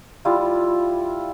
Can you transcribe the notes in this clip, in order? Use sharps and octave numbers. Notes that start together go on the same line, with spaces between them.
G3 E4 F4